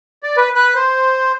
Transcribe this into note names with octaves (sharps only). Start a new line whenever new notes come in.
D5
B4
B4 F#6
C5